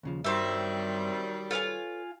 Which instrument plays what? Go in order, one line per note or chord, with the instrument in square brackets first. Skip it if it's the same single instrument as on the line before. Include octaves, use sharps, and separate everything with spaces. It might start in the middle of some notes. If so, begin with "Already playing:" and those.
[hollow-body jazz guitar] D#2 C#3 F3
[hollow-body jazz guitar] G2 [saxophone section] D#3 F#3 G3 [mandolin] C4 E5
[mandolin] F4 F5 G#5 [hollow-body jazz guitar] A4 B4 C#5